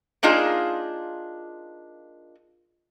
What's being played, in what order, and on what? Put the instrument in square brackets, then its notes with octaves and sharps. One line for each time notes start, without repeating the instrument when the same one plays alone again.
[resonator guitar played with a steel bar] A#3 D4 D#4 F4 G#4